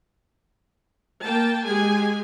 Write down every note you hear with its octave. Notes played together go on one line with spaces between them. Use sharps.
A#3 G5 A5
G#3 G4 G#4 G#5